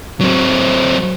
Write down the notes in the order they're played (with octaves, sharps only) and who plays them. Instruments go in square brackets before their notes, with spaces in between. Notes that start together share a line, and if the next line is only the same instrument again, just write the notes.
[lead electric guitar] F#3 C4